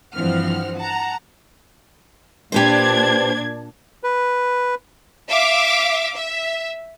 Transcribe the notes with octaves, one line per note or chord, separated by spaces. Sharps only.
G2 E3 F3 C4 F#5 F6
F#5 A5 A#5
A#2 D4 G4 B4 C5 G#6
B4
E5 F5 D6
E5